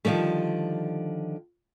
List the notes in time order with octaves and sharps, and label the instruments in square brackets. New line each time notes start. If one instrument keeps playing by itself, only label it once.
[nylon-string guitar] D3 D#3 F3 G3 A3